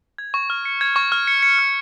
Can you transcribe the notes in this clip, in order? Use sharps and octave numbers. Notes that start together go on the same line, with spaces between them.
G#6
C#6
F6
C#7
G#6
C#6
F6
C#7
C#7
F6